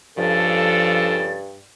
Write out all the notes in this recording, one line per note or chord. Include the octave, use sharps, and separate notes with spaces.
G2 C#3 F3 D4 A4 A6